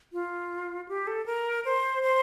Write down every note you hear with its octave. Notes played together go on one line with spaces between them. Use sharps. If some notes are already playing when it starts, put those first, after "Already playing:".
F4
G4
A4
A#4
C5
C5